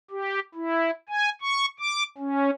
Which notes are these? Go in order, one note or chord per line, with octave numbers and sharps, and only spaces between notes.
G4
E4
G#5
C#6
D6
C#4